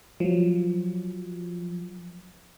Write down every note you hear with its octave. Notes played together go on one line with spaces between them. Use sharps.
F3 F#3